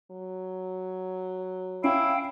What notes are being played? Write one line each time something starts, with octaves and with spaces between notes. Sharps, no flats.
F#3
C#4 E4 F5 G5